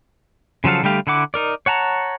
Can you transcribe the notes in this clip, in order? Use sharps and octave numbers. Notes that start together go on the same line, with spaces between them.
C#3 F3 F#3 A4 F5
D3 G3 A3 G4 F5
D3 E4 F#5 D6
D#4 A#4 D5
C#5 F#5 A5 A#5